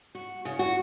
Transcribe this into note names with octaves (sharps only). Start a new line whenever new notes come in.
F#4
C#3
F#4